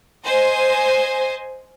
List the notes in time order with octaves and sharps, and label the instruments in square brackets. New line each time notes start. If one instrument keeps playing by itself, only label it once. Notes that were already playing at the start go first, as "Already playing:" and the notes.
[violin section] C5 D#5 G#5